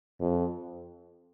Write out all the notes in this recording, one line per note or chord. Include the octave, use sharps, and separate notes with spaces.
F2